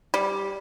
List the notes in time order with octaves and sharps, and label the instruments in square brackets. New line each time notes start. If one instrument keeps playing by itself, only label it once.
[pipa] G3